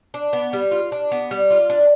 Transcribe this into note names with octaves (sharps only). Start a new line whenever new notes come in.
D4
B3
G3
F4
D4
B3
G3
F4
D4